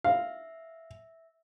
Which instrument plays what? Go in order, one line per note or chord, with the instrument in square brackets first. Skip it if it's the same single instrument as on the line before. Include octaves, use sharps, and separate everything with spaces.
[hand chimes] E5 [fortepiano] F5